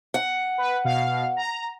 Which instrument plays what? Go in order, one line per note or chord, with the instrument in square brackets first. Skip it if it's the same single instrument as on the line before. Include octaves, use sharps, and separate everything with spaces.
[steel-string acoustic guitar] F#5
[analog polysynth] B4
B2 F5
A#5